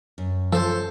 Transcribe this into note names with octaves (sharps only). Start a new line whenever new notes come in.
F#2
F3 A4 C5